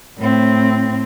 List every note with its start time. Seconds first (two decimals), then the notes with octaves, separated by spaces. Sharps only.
0.18 A2 C4